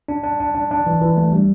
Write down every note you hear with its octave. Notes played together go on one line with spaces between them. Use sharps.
D4
D4
D4
D4
D4
E3
E3
A3
G3